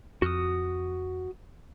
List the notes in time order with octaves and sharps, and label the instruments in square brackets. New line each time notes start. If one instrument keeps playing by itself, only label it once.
[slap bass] F2 [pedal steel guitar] F#4 D#6